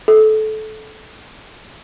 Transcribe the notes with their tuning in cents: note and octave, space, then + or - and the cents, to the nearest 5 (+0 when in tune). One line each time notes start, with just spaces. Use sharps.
A4 -20